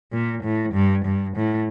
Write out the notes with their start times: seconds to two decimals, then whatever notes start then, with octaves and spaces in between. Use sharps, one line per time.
0.12 A#2
0.43 A2
0.73 G2
1.05 G2
1.36 A2